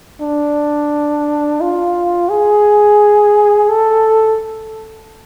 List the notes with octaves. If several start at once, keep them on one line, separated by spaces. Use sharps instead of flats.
D4
F4
G#4
A4